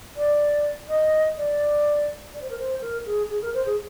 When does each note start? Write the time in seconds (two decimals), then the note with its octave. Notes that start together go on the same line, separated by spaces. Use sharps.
0.17 D5
0.89 D#5
1.38 D5
2.34 D5
2.41 C5
2.50 A#4
2.59 C5
2.81 A#4
3.06 G#4
3.30 G#4
3.42 A#4
3.54 C5
3.66 G#4